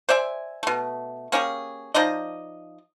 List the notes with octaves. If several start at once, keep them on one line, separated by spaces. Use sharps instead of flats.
C5 D5 E5 G#5
B2 A3
A#3 C#4 G4 G#4
F3 D#4 D5 D#5